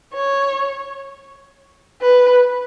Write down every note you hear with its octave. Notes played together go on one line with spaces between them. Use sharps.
C#5
B4